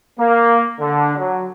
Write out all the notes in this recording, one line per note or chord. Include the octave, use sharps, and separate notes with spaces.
A#3
D3
F#3